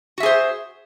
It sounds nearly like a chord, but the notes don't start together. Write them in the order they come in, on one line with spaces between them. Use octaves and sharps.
F#4 E5 G#4 C5